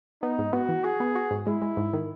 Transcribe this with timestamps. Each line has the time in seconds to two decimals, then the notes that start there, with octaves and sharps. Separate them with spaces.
0.22 B3 D#4
0.38 G#2
0.53 B3 F#4
0.69 E3
0.84 F#4 G#4
1.00 B3
1.15 F#4
1.31 G#2
1.47 G#3 E4
1.62 G#3
1.77 G#2
1.93 D#3